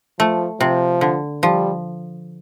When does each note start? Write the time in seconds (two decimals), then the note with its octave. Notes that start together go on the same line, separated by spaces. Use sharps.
0.19 F3 A3
0.60 C3 F3
1.01 D3
1.43 F3 G3